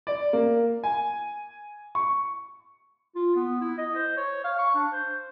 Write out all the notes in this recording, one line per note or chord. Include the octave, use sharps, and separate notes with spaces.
D5
A#3
G#5
C#6
F4
B3
E4
D#5
C5
C#5
F5
C#6
D4
C5